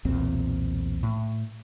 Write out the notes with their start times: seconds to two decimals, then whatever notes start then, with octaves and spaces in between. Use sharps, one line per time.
0.05 B1 E2 A#2 C4
1.03 A2